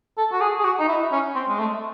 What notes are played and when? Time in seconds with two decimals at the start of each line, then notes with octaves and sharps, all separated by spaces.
0.18 A4
0.32 F#4
0.41 G#4
0.59 G#4
0.64 F#4
0.79 D#4
0.88 E4
1.12 C#4
1.35 C4
1.49 G#3
1.59 A3